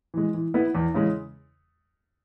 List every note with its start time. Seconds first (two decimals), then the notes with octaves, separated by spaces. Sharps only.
0.14 E3 G#3
0.34 E3
0.54 B3 E4 B4
0.75 E2
0.94 C#3 E3 G#3